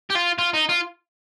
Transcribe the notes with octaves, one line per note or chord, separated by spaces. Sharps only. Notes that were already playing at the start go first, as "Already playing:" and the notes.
G4
F4
F4
D#4
F4